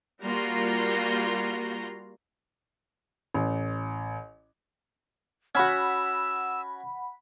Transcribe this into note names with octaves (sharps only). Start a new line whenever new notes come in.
G3 A#3 F4 F#4 A#5 C6
A1
C#4 F#4 F#5 B5 E6